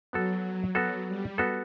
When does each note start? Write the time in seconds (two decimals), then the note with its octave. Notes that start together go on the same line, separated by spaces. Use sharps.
0.13 F#3 B3 F#4 A4
0.75 F#3 B3 F#4 A4
1.07 G3
1.38 B3 F#4 A4